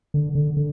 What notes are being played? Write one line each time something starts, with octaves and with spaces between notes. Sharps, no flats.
D3
D3
D3